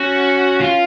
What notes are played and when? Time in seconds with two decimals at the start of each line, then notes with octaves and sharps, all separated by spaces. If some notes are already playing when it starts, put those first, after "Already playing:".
Already playing: C#4 F#4
0.61 F4